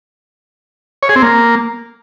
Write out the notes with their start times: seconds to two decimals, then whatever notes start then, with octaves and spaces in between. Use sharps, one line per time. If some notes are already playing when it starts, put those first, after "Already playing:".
1.03 C#5
1.09 G#4
1.16 C4
1.22 A#3